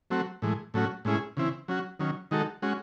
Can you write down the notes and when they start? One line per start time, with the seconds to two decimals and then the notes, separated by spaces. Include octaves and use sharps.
0.10 F#3 A3 C4 F#4
0.42 A2 E3 G#3
0.74 A2 F#3 A3 C#4 F#4
1.05 A2 G#3 C#4 E4 G#4
1.37 C#3 E3 C4 E4
1.68 F#3 C#4 F#4
2.00 D#3 F#3 C#4
2.31 D#3 G#3 D#4 F#4 A4
2.62 G#3 C#4 F#4